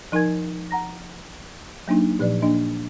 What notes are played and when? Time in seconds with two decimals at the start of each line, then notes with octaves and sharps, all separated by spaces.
0.12 F3 D#4 A#4 G#5 G#6
0.71 F#5 A#5 A#6
1.88 F#3 A#3 D4 D#4
2.19 A#2 F3 B4 D5
2.42 A#3 D4 D#5